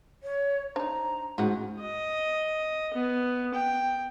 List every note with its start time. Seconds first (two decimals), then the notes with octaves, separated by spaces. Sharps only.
0.23 C#5
0.76 D4 D#4 C5 A#5
1.38 G#2 C#3 F#4 F#5
1.80 D#5
2.94 B3
3.54 G5